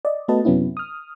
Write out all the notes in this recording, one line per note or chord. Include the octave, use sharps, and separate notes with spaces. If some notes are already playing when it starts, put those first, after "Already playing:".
D5 D#5
A3 B3 F#4 B4 D#5 A5
F#2 C3 F#3 B3 C#4 E4
D#6 F6